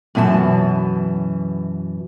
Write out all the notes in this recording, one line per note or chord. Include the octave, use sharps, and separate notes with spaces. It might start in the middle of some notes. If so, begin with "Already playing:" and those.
F#2 B2 E3 A4 A5